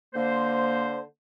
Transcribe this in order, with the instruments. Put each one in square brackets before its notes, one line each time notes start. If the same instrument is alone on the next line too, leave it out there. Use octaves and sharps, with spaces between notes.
[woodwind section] D3 A#3 C5